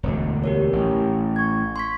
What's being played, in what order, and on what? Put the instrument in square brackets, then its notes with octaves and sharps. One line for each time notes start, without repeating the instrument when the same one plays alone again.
[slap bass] E1 D2 D3
[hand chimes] G4 A#4 C#5
[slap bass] A1
[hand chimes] C#6 G#6
C6 C#6 B6